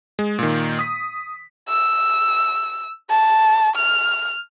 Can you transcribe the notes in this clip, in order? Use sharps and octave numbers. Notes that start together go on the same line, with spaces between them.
G#3
A#2 D#3
D#6 B6
E6
A5
F6